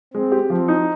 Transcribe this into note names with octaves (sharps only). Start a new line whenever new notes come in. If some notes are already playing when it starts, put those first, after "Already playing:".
G#3 C4
G4
F3 C4
D#4